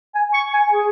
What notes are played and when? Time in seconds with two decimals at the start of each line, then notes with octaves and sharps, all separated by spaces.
0.15 G#5
0.34 C#6
0.53 G#5
0.72 G#4